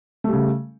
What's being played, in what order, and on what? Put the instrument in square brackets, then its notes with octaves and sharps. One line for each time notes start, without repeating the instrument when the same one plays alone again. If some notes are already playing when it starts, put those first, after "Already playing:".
[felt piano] A3
G3
C#3